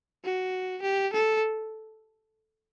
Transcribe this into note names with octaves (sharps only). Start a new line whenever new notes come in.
F#4
G4
A4